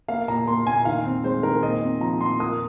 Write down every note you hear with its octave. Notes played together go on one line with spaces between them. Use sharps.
A#3 F5
A#2 A#5
A#3 C6
A#2 G#5
D#3 F5
C4
G#3 C5
D#3 A#4
A#2 D#5
C4
F3 A#5
A#2 C6
A#3 D#6